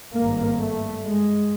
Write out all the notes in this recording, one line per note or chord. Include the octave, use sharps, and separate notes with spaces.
G2 A#3
G#1
A3
G#3